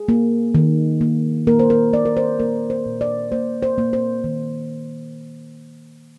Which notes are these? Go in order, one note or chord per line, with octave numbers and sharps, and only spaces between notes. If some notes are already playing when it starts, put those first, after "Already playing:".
Already playing: G#4
A#3
D#3
A#3
A#3 A#4
C5
A#4
A#3 D5
A#4
C5
A#3 A#4
C5
A#2
D5
A#3 C5
C5
A#3
C5
D#3